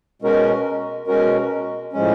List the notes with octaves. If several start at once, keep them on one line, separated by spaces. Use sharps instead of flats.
B2 G#3 C#4 F#4 A#4
B2 G#3 C#4 F#4 A#4
A2 F3 G#3 C#4